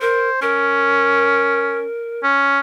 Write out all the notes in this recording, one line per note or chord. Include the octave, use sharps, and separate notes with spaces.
A#4 C5
C#4 A#4
C#4